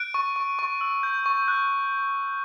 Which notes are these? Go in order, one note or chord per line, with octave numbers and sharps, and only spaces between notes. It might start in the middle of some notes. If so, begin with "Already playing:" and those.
Already playing: F#6 D7
C#6
C#6
C#6
E6
G6
C#6
F#6